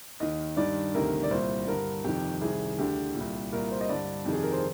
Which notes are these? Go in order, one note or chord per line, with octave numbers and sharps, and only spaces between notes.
D#2 D#3 D#5
G2 D#3 D5
D2 C3 D#3 A#4
D5
C2 A#2 C5
G2 D3 A#4
F2 C3 D#3 G4
C2 C3 D#3 G#4
D2 D3 G4
A#2
C2
C2 A#2 A#4
C5
D#5
G2 D3 D5
F2 C3 D#3
G#4
A#4
C5